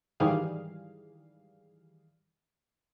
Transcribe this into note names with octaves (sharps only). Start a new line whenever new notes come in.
G#2 D#3 E3 G3 G#4 F5